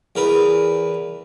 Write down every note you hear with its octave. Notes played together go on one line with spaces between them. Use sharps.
E2 A#4 B4